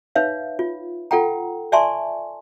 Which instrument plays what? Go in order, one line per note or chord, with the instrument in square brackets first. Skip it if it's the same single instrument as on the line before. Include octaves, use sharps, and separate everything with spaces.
[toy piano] D#4 B4 C#5 E5 F5
F4
F4 A4 F#5 G5 A#5
D5 E5 G#5 A5 C6 C#6